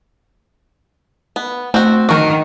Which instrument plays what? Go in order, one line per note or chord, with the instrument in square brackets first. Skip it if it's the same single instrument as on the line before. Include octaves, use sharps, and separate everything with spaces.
[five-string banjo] B3
[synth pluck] A3 [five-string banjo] C4 F#4
[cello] D#3 [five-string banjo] F#4 A#4 [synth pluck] C#6